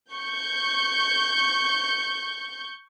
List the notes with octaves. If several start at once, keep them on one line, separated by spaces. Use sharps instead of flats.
C#6 G6